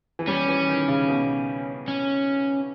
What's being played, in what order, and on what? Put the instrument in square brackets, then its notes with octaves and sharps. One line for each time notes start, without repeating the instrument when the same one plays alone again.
[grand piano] E3
[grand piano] G3 [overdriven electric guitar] C#4
[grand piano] E3
D#3
C#3
B2
[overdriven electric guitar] C#4